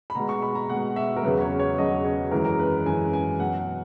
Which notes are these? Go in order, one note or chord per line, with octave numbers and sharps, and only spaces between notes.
B5
B2 G#3 A#5
C#6
B5
A#5
B2 G#3 F#5
E5
A#4
E2 C#3 F#3 B4
C#5
C#5
E2 C#3 F#3 D#5
C#5
F#2 E3 G#3 A#4
A#4
B4
F#2 E3 G#3 G#5
G#5
B2 F#3 F#5
F#5